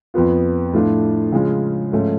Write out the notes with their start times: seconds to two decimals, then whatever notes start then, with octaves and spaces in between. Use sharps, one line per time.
0.14 F2 F3 B3 F4
0.73 A2 F3 A3 D4 F4
1.32 C#3 F3 G#3 C#4
1.92 G#2 F3 A3 C#4 F4